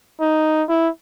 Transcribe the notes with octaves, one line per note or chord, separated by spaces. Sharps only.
D#4
E4